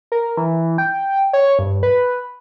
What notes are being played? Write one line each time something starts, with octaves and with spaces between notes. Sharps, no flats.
A#4
E3
G5
C#5
G2
B4